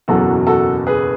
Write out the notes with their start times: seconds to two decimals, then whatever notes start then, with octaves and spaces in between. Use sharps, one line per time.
0.08 F#1 E2 B2 F#3 F#4 A4
0.47 F#4 A4
0.87 G#4 B4